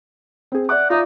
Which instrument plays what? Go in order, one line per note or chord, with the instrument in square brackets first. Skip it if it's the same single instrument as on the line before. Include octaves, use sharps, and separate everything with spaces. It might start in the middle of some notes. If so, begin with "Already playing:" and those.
[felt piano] C4 G#4
[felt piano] D5 E5 D6 [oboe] F#5
[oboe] D#4 [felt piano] F4 D5 E5